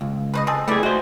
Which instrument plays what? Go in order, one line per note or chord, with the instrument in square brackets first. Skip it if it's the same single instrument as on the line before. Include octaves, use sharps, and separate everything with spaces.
[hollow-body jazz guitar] C#2
[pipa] B4 C5 D#5
C4 G#4 A4
[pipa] E3 G3 D5 [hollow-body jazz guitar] A3 G#4
[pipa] G#3 [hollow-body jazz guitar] F#4 C5